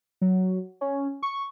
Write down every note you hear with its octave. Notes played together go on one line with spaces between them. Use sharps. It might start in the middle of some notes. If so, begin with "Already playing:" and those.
F#3
C#4
C#6